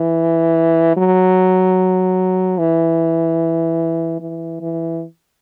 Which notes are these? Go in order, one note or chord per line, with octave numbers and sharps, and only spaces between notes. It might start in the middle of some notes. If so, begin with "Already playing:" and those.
Already playing: E3
F#3
E3
E3
E3